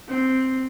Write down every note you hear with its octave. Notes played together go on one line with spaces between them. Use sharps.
C4